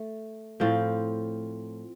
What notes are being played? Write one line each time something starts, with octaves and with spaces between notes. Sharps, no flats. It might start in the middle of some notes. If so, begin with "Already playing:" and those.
Already playing: A3
A2 F3 C4 F4